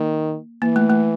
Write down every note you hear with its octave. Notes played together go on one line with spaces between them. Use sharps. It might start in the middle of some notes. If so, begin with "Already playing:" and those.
Already playing: D#3 A#3
E3 A#3
A3
A3